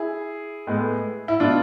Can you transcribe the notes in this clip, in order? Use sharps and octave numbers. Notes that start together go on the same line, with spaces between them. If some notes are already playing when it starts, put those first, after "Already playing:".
Already playing: E4 G#4
A2 G#3 B3
E4
B2 B3 D4 F4